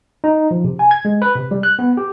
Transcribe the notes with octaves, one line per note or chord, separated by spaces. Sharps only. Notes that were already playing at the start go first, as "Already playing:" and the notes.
D#4
F3
C3
G#5
G#6
G#3
B4
C3
G3
F#6
B3
G4